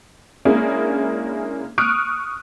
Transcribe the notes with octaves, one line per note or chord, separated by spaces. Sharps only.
G#3 A#3 C#4 D4 E4 G#4
C#6 D#6 F6 F#6 D7